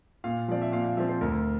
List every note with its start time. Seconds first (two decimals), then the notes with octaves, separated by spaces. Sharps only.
0.24 A#2 F5
0.48 F3 C4 D5
0.62 E5
0.72 A#2 F5
0.85 F5
0.97 F3 C4 E5
1.09 C5
1.21 D2 A#4